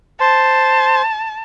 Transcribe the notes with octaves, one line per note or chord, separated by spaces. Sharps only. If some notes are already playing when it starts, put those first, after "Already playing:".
C5 A5 C6